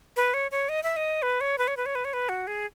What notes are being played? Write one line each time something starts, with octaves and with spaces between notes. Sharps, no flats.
B4
C#5
C#5
D#5
E5
D#5
B4
C#5
B4
C#5
B4
C#5
B4
C#5
B4
F#4
G#4